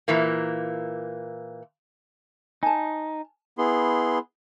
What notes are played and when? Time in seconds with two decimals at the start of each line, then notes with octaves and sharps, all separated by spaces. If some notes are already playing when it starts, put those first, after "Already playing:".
0.08 A#2 E3 A#3
2.63 D#4 G#5 A5
3.58 B3 E4 G#4 C6